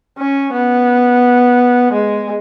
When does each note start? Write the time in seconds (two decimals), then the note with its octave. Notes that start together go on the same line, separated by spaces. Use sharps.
0.18 C#4
0.53 B3
1.93 G#3